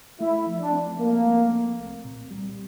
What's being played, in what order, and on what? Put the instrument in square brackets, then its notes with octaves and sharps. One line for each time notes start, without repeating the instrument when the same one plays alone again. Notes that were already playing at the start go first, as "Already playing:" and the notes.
[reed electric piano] A3 [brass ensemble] E4
[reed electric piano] F3
[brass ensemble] D4
[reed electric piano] C4
[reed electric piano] A3 [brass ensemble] A#3
[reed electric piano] A3
C4
C2
A#2
G3